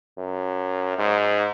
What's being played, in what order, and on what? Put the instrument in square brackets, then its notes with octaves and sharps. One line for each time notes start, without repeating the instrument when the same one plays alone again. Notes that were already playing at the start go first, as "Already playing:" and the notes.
[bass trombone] F#2
G#2